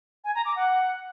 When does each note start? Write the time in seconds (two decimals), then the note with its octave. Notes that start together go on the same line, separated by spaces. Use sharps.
0.24 G#5
0.35 A#5
0.45 D6
0.56 F#5